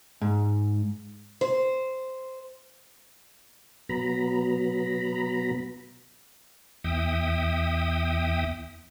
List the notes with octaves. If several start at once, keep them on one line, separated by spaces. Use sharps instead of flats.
G#2
C5
B2 F#3 B3 A#5 B5
E2 E5 G5 D#6